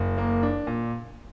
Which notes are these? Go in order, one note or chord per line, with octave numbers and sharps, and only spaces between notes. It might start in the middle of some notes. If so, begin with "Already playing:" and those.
Already playing: F#1
A#3
D4
A#2